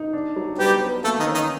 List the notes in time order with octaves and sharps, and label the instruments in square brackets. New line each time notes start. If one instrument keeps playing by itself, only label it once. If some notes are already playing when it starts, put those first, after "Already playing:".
Already playing: [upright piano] D#4
D4
F#3
[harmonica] G3 G4 [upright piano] B3
[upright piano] B3
[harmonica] A3 A4 [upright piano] A#3
[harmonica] D#3 D#4
[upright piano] C#4
[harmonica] D#3 D#4